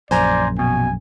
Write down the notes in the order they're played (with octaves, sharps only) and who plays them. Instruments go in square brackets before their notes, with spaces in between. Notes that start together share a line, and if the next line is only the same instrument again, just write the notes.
[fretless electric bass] A#1 F#2 [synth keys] C5 G#5 A#5 [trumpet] D5
[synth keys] B2 [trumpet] G#5